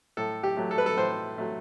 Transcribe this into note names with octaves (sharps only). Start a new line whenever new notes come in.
A2 A4
G4
F#3 A3
A4
B4
A4
A2 C5
F#3 A3